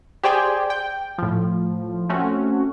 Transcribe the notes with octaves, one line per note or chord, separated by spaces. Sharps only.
G4 G#4 C5 D5 G5 G#5
G5
A2 F3
A3 C4 C#4 F#4